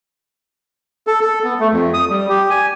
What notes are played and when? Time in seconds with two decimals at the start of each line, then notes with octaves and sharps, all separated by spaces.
1.07 A4
1.21 A4
1.44 B3
1.60 A3
1.72 F2
1.94 D#6
2.10 G3
2.28 G4
2.50 G#5